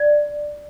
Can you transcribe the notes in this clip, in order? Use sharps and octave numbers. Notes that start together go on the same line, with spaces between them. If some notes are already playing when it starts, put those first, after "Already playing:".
Already playing: D5